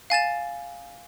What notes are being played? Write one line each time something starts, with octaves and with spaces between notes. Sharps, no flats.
F5 G#5 A6 E7